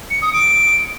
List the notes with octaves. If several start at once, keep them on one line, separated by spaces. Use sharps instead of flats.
C#7
D#6
D7